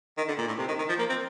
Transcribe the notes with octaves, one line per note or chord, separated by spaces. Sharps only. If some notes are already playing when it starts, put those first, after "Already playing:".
D#3
D3
A#2
A2
C3
D#3
D#3
F3
A#3
C4